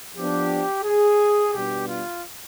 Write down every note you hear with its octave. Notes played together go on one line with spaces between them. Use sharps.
F3 B3 D4 G4
G#4
B2 G3 B3 D4 G4
F4